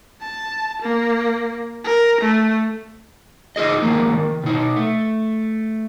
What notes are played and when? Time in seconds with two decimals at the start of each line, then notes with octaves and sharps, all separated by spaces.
0.21 A5
0.82 A#3
1.84 A#4
2.21 A3
3.56 D#4 F4 G#4 D#5
3.82 D#3 F3 G#3 A#3
4.13 D#3
4.43 B2 D#4
4.77 A3